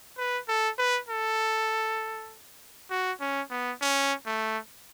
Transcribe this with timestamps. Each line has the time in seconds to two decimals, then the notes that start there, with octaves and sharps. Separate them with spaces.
0.18 B4
0.48 A4
0.79 B4
1.09 A4
2.90 F#4
3.20 C#4
3.51 B3
3.81 C#4
4.26 A3